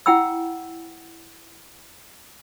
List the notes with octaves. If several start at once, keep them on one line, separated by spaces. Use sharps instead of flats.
E4 F#5 G5 B5 E6